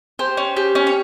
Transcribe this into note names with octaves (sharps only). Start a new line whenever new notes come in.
G4 C5
C#4
G4
C#4
C#5